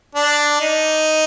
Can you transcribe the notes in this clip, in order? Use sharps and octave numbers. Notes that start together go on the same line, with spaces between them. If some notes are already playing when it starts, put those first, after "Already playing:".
D4
D#4